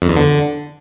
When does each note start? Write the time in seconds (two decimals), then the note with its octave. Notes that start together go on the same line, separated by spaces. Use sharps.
0.02 F2
0.09 E2
0.17 D3